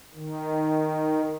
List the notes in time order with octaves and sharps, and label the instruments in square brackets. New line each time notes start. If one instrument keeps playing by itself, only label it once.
[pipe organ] D#3